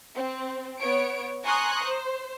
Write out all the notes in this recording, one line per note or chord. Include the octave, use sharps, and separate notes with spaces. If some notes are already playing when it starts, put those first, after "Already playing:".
C4
B3 C#5 D7
G#5 A#5 C6 C#6 D#6 F#6
C5